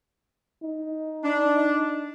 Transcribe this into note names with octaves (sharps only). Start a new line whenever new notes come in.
D#4
D4